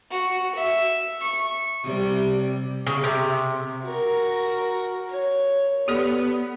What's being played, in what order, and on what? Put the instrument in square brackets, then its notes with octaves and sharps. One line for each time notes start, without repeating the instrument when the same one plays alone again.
[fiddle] F#4
E5
C#6
[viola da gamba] C3 G3
[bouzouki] C#3
C3
[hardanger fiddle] F#4 A#4
C#5
[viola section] B3 [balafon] G4 A4 D5